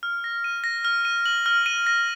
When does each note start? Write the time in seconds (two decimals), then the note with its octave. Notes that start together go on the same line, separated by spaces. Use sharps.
0.03 F6
0.24 A#6
0.44 D#7
0.64 A#6
0.85 F6
1.05 D#7
1.26 F#7
1.46 F6
1.66 D#7
1.87 A#6